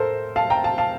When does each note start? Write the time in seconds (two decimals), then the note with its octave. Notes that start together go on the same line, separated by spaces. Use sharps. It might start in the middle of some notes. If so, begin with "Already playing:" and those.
Already playing: A2 A4 A#4 C5
0.36 F5 A5
0.50 G5 A#5
0.64 F5 A5
0.78 F5 A5